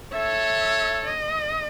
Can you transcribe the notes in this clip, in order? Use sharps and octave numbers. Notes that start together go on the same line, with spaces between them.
A4 C#5 E5
D#5